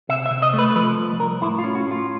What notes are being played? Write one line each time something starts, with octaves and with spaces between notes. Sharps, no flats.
C3 E5
E5
C3
D#5
A3
B4
F3 B4
C2
C2 A#4
A2 E4
F4
C#4
F#4
A2
F4